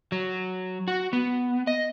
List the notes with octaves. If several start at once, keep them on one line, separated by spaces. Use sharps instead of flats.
F#3
F#4
B3
D#5